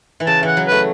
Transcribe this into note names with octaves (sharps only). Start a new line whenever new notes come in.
E3
C#3 A5
E3 F#5
F#3
A3 B4